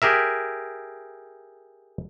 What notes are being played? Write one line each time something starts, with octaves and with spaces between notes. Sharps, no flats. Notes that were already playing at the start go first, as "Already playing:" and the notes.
G4 G#4 A#4 E5